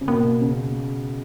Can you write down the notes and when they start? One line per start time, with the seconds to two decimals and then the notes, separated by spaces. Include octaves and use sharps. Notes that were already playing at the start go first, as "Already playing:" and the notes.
0.01 C#3
0.08 B2 A#3
0.41 C#3